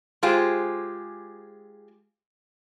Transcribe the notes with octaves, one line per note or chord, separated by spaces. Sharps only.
G#3 F4 G4 G#4 C5